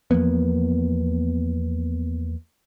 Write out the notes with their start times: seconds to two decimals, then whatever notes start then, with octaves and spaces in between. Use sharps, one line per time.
0.11 E2 F3 A#3 B3